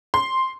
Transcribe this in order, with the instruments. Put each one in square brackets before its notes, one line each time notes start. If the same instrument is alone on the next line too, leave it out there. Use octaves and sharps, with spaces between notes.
[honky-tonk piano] C6